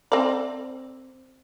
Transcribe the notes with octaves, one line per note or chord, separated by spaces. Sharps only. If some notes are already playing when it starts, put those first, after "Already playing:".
C4 D5